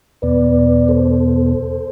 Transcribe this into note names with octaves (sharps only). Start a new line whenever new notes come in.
E2 B2 B3 B4 D5
A4 C5